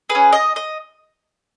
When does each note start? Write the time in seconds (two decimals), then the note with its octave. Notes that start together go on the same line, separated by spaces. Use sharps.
0.09 G#4 B4
0.15 C#4
0.32 D#5
0.56 D#5